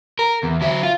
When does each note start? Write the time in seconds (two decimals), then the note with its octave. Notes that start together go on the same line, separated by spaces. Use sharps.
0.19 A#4
0.43 E2
0.61 F#3 E4
0.83 F4